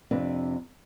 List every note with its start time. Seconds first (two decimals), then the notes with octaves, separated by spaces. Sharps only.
0.11 F2 C3 D4 B4